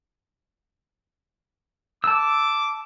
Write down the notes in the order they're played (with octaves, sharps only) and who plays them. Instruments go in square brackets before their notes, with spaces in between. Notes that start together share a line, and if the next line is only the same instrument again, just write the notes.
[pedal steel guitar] A5 E6 [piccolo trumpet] D6